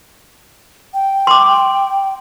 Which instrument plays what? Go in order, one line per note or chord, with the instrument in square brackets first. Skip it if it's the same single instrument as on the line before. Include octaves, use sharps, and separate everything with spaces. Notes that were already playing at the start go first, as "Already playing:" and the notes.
[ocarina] G5
[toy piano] C6 D6